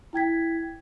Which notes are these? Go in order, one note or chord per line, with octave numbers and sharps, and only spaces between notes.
E4 G5 G#6 B6